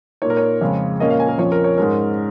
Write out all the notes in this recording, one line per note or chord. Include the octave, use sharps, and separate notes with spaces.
A#2 A#3 D#4 C#5
A#4
C#5
F2 C#3 G#3 C#4
A#2 A#3 C#4 D#5
F5
G#5
A#4
F2 F3 C#4 C#5
A#4
C#5
G#2 G#3 C#4 A#4